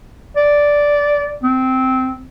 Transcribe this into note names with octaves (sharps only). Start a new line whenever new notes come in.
D5
C4